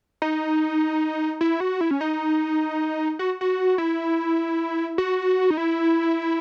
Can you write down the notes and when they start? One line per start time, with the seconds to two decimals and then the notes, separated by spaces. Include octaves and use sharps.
0.22 D#4
1.41 E4
1.60 F#4
1.81 E4
1.91 C#4
2.01 D#4
3.19 F#4
3.41 F#4
3.78 E4
4.98 F#4
5.50 D#4
5.57 E4